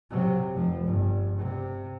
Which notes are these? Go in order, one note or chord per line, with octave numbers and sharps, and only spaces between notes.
C3 F#3
F1 F3
G1 G2
C3